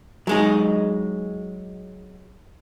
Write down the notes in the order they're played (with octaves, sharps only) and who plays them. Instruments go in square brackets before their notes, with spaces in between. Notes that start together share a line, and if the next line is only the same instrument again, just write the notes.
[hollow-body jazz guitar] F#3 G#3 D#4